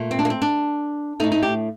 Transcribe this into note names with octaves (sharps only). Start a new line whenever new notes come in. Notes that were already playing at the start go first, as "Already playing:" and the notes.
Already playing: A#2 A3
C4
D4
A#3
C4
D4
A2 A3 D#4
D#4
G4